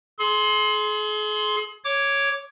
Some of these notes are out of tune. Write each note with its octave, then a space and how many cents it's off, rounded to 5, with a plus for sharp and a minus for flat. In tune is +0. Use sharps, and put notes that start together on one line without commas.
G#4 +40 C6 +0
C#5 +0 D6 -10